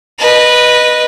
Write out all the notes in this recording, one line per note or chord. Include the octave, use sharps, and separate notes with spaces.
B4 D#5